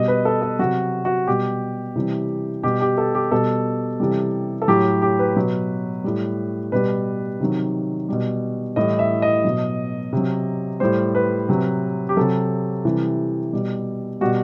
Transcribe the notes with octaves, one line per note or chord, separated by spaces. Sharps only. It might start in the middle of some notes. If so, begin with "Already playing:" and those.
Already playing: B2 G3 D#5
B4
A4
A4
C3 F#3 F#4
F#4
B2 G3 G4
C3 E3 G3
B2 G3 G4
G4
A4
G4
B2 G3 A4
C3 E3 G3
A4
A2 F#3 G4
G4
B4
B2 F#3
A2 G3
B2 G3 B4
C3 D#3 F#3
B2 G3
A2 E3 G3 D#5
E5
D#5
B2 F#3
C3 F#3
A2 G3 C5
B4
C3 F#3
G4
C3 F#3 A4
C3 E3 G3
B2 G3
B2 G3 F#4